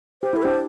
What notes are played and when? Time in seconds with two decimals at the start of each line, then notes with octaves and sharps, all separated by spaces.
0.22 G4 C5
0.33 E4 A4
0.43 D4 G4 C5